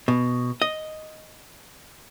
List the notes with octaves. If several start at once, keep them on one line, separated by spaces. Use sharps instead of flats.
B2
D#5